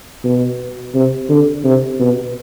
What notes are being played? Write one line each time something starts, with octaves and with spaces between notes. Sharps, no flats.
B2
C3
D3
C3
B2